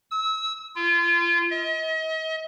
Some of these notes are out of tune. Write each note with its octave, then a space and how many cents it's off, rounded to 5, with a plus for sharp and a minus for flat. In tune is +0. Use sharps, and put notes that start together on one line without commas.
E6 -30
F4 -30
D#5 +40